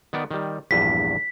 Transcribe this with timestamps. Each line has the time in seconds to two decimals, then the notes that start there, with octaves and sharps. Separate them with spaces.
0.13 D#3 B3 D5
0.31 D#3 G3
0.71 A#1 E2 G2 B6